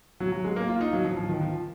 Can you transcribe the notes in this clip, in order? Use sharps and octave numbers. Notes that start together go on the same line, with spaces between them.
F#3
F#3
G#3
A#3
F4
D#4
F#3
F3
F3
D#3
F3